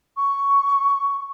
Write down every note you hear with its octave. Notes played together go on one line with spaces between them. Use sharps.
C#6